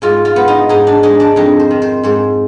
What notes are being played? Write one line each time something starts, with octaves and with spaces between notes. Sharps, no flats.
G#2 F4
F4
B3
D#4
G#2 D#4
D4
G#3 D#4
D4
F2 D#4
C5
D#3
C5
G#2 C5